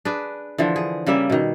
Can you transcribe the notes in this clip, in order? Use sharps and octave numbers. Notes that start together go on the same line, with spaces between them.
D4 G#4 B4
D3 E3 F3
G#4
C#3 G3 A#3 E5
B2 D#3